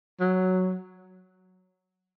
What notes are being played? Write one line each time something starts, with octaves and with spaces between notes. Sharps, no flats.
F#3